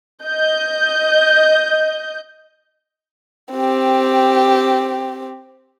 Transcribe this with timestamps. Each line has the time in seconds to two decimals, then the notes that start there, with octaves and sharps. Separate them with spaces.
0.23 D#5 G6
3.53 C4 G4